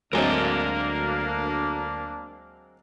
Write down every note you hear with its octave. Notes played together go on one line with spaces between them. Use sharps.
D2 F#3 G#3 A#3 C4 D4 A#4 G#5